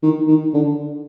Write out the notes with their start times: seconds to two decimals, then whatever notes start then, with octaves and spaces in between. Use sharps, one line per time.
0.03 D#3
0.28 D#3
0.54 D3